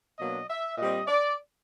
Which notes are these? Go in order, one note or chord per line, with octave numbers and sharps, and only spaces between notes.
B2 F#3 A#3 D4 D#5
E5
A#2 G3 C4 D#5
D5